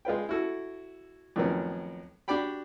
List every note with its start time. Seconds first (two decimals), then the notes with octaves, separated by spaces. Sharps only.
0.05 G#3 F4 B4 G5
0.29 E4 F#4 A4
1.36 F2 A2 D#3 F#3 B3 C#4
2.28 D4 F#4 G4 D5 G5 B5